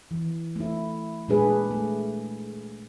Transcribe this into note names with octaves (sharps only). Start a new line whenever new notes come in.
E3
A3 E4
A#2 G#3 D4 G#4 B4
A3